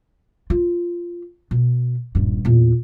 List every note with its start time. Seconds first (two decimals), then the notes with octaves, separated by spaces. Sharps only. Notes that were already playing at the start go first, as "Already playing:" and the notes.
0.50 F4
1.51 B2
2.15 D#1 G2
2.45 E2 A#2